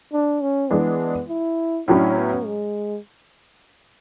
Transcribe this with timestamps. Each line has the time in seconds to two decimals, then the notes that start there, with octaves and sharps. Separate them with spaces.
0.13 D4
0.42 C#4
0.70 E3 G#3 B3 D4
1.29 E4
1.88 A2 F#3 C#4 D4 E4
2.17 B3
2.46 G#3